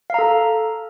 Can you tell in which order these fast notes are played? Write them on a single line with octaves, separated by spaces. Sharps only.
F5 A#5 A4